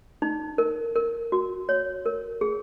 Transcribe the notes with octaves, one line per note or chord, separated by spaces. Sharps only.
D#4
A#4
A#4
F#4
C#5
A#4
G#4